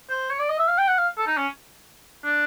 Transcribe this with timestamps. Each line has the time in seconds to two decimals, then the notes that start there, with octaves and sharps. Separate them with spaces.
0.10 C5
0.30 C#5
0.40 D5
0.49 D#5
0.59 E5
0.69 F5
0.78 G5
0.88 F#5
0.98 F5
1.18 A4
1.27 D#4
1.37 C#4
2.25 D4